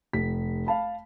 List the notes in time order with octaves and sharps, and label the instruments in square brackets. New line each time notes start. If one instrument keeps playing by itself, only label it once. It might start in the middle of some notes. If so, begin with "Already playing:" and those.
[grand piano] F1 B6
F5 A5 B5